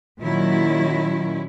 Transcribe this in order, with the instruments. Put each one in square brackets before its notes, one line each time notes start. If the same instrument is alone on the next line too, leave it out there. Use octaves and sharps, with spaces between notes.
[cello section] A#2 D#3 F#3 C#4 E4